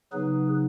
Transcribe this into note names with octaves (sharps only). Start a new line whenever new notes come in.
C#3 F#3 B3 D#4 G#4 B4